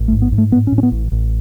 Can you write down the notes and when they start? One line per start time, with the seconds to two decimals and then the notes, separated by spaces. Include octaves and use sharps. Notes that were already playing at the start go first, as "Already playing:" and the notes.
Already playing: A1
0.08 A3
0.12 G#2
0.22 B3
0.32 G#2
0.38 A3
0.52 A2 B3
0.67 C#4
0.72 A2
0.78 C#4
0.83 B3
0.92 A1
1.12 A1